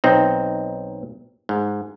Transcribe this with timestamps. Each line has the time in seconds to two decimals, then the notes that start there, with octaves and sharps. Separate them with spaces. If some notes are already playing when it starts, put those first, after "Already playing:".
0.04 B1 C4 D#4
1.49 G#2